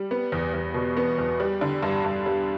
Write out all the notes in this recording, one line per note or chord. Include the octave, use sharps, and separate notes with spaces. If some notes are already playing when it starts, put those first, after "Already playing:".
Already playing: G3
B3
E2
E2
B2
B3
E2
G3
D3
G2
G2
G3